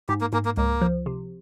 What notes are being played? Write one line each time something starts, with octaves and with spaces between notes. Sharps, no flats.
G#2 G4
A#3
G#2 A#3
A#3
C#2 A#3
F3
C3